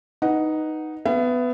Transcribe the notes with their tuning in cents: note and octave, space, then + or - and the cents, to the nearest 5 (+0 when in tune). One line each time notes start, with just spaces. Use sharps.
D#4 +0 B4 -5 F#5 +0
B3 +15 E5 +40